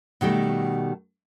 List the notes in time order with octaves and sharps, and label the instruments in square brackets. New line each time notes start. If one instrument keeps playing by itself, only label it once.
[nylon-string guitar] B2 D#3 G3 A3